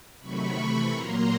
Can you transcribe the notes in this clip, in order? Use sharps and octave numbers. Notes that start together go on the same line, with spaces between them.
C3 D#3 F#3 A3 B5 C#6
C3 E3 A3
A#2 F#3 A#3 A#5 C6